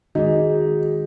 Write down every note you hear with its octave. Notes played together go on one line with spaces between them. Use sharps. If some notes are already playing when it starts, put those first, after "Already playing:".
D#3 G#3 D#4 F#4 G#4